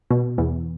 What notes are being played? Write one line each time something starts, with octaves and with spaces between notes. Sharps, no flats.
B2
E2